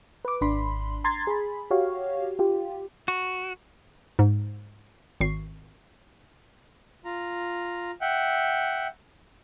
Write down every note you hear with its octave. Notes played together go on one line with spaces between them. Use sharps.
B4 D6
G#1 D4 B5 C6
A#5 C6 G#6 A6
G#4 B5
F#4 G4 C#5 F5
F4 G4
F#4
G#2
G#1 C#6 C7
F4 A#5
E5 F#5 G5